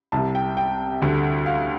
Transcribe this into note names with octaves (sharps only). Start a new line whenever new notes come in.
C2 C3 G3 A5
G5
G5
D2 D3 G3
F5